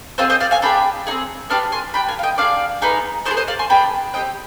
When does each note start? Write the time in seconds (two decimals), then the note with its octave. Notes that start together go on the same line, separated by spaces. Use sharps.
0.18 C4 F4 G#4 C5 D#5
0.30 C5 D#5
0.40 D5 F5
0.51 F5 G#5
0.62 D4 G#4 G5 B5
1.07 D#4 G#4
1.11 C4
1.50 B3 D4 G4 D5 F5
1.72 G#5 C6
1.94 D4 G4 G5 B5
2.08 F5 G#5
2.19 F5
2.23 D#5 G5
2.38 D4 G#4 D5 F5
2.82 B3 D#4 G#4
3.25 B3 F4 C5
3.31 G#4
3.37 C5 D#5
3.48 D5 F5
3.59 G#5 C6
3.69 B3 D4 G#4 G5 B5
4.14 C4 D#4 G4 D#5 G5